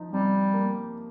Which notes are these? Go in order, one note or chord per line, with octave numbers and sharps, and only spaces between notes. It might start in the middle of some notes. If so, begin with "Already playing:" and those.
Already playing: F3 D#4
C3 G3
A#3